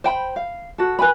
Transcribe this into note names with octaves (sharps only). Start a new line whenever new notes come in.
C5 G5 B5
F5
F#4 A4
B4 G#5 B5